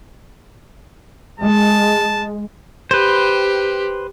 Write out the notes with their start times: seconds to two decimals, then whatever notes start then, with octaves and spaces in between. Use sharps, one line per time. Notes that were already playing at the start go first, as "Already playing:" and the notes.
1.40 G#3 A5
2.91 G4 B4 C5